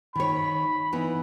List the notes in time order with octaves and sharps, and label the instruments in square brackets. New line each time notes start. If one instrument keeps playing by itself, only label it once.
[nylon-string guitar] D#3 C#5 [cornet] B5
[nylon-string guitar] E3 B3 D#4